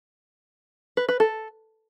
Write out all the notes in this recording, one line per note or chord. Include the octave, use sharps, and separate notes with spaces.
B4
B4
A4